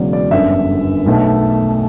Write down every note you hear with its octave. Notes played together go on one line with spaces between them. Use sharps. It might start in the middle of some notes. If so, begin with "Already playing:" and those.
Already playing: E1 E2 C#3 F#3 D5
D5
G1 F#2 D3 E5
B1 B2 A3